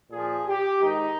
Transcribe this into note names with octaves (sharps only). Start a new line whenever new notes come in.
A#2 F3 G#4
G4
G#2 D#3 D#4